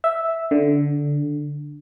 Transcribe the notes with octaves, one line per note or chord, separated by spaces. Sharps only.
E5
D3